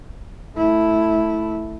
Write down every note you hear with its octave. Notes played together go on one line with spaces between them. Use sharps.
A3 E4